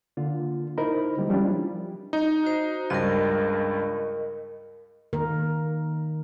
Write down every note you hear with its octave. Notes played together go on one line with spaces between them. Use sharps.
D3 A#3 F4
D#4 E4 A#4 C5 D#5 B5
D3 G3 G#3 A#3
F3 G3 C#4 D4 E4 F4
D#4
F#4 C5
C#2 G2 A#4 D#5
D#3 A#3 A#4